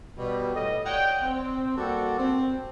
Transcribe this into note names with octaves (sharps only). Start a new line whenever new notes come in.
B2 G3
A2 D#5
C#5 D5 F#5 G5
C4
G3 A#3 F#4 A4 D5 F#5
C4